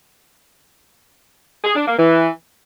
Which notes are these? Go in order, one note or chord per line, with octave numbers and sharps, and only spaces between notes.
G#4
D4
A#3
E3